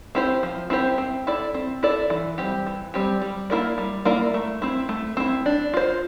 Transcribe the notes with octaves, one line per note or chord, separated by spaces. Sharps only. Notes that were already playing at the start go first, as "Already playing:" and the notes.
C4 E4 G4 C5
F3
C4 E4 G4 C5
C4
E4 A4 D5
C4
E4 A4 D5
E3
G3 C4 G4
E3
G3 C4 G4
G3
A#3 E4 A#4 D5
G3
A#3 E4 A#4 D5
A3
C4 E4
A3
C4 E4
D4
F4 C5